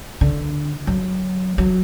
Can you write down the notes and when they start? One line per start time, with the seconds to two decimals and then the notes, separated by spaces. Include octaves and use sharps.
0.21 D3
0.87 F#3
1.58 F#3